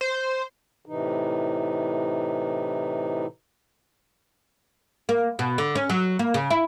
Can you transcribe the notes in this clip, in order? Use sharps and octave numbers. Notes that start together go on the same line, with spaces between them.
C5
A2 C3 E3 D#4
A#3
B2
D3
C#4
F#3
A#3
C#3
E4